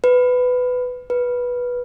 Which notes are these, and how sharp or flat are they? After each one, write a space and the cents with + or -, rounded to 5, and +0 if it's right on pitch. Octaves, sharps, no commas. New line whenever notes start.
B4 +15
B4 -10